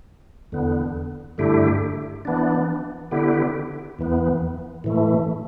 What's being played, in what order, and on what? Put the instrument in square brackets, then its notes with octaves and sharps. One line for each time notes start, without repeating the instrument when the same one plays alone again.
[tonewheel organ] E2 D3 B3
G2 D3 A3 E4 G4
E3 B3 D4
D3 B3 E4 G4
E2 E3 B3
A2 E3 A3